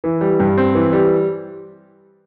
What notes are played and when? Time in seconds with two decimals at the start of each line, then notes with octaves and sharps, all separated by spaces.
0.04 E3
0.21 G3
0.40 G2
0.57 C4
0.75 E3
0.93 G3